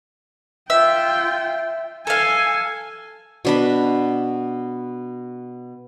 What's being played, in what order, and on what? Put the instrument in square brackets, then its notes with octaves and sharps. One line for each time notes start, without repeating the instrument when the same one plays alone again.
[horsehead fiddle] F4 G5 [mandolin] E5
[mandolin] A4 F5 [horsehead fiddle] G#5
[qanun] B2 D4 B5